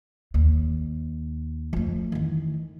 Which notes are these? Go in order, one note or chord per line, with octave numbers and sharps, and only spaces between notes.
D#2
F2 A3
D#3 E3